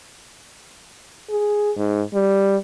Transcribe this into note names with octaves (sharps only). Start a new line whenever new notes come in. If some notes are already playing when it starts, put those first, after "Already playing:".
G#4
G#2
G3